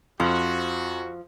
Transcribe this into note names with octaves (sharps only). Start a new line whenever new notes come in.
F2 F3 F#4